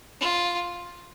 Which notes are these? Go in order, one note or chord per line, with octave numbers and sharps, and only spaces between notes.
F4